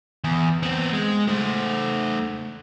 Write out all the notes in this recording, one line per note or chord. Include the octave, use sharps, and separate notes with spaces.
E2
B3 C4
G#3
A3 C5